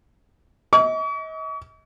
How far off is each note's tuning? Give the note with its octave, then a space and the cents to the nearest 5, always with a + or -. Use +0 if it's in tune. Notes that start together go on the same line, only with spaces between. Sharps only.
D#5 +35 C#6 +40